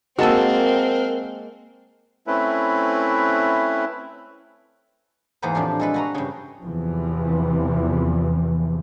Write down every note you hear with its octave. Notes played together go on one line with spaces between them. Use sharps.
G#3 A#3 C4 F#4 A#4 A5 E6
A3 C4 C#4 E4 B4
E2 G#2 A#3 B3 B4 C5
A2 C3 F3 D4
G#3 A4 B4
F#4 B4 A#5
G2 C#3
E2 C3 E3 F3